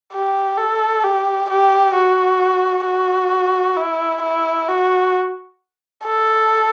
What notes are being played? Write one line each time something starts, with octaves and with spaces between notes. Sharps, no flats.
G4
A4
G4
G4
F#4
F#4
E4
E4
F#4
A4